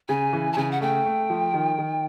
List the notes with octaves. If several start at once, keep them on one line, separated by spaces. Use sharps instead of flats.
C#3 G#5
E3
A5
C#3 G#5
F#5
A3 G5
A3
F3
D#3
D#3